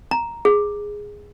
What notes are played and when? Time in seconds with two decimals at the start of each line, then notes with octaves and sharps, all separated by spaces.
0.11 A#5
0.45 G#4